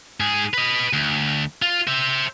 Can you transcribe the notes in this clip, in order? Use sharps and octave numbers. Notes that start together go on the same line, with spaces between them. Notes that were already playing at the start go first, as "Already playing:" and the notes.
G#2 G#4
B4 D#5
D2
F4
C5 E5